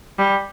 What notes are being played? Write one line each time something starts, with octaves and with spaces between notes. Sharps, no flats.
G3